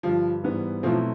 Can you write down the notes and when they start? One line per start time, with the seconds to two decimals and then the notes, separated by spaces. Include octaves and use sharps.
0.03 G2 D3 F3 G3
0.43 G#2 E3 G3 B3
0.83 B2 F3 F#3 A3 C4 E4